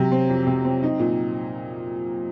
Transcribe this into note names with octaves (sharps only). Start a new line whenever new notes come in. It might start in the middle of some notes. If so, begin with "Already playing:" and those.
Already playing: C3 F#3
C4
F2
C3
C4
D#4
A#2